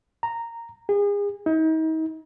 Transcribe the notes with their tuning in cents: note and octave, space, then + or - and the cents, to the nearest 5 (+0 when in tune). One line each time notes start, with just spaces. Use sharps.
A#5 -10
G#4 -35
D#4 +40